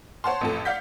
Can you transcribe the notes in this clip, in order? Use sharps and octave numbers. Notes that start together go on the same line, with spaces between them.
C5 C#5 F#5 A5 C6
A1 F2 A4
D5 F5 F#5 G6 B6